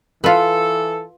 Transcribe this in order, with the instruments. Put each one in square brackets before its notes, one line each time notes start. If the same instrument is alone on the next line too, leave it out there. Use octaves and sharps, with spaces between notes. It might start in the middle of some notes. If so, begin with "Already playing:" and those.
[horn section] E3 A4 [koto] F4 B4